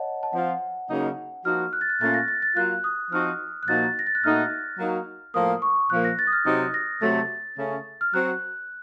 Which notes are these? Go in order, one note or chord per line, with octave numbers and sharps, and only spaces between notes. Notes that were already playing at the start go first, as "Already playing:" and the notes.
Already playing: C#5 D#5 F#5 A5
A5
F3 C4 F4 F#5
C#3 F#3 A#3 D#4
F3 A#3 D#4 F#4 F6
F#6
A6
F#6
A#2 A3 C#4 F4 A6
A#6
A6
A6
F#3 A#3 F4 F#6
D#6
F3 C4 D#4 F#4 F6
F#6
A#2 F3 A#3 D#4 F#4 A6
A#6
A6
F#6
A#2 A3 D#4 F#4 F6
F#3 A#3 D#4 F#4
A2 F3 A#3 D#6
C#6
A#2 F3 A#3 F#6
A#6
A6
D#6
F6
C3 F#3 C4 D#4 D#6
A#6
C3 F#3 A3 A6
C#3 A3 C#4
F6
F#3 C4 F#4 F#6